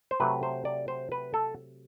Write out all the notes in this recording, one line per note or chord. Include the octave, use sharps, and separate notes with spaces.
C5
C3 F#3 A3 B4
C5
D5
C5
B4
A4